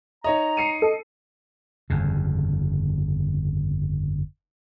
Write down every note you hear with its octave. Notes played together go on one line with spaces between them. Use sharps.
D#4 C#5 D#5 A#5
C7 C#7 D#7
A4 D#5
G1 F2 C#3